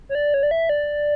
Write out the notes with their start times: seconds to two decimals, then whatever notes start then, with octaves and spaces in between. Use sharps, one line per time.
0.09 C#5
0.15 D5
0.34 C#5
0.43 D5
0.51 E5
0.69 D5